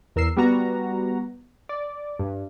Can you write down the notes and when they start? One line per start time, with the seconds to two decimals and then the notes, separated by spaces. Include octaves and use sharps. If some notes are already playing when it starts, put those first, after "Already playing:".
0.16 E2 A#4 E6 C7
0.37 G3 B3 F#4 A#5
1.69 D5
2.19 G2